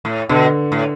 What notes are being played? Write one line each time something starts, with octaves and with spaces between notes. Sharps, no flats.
A2
B2 D3
A2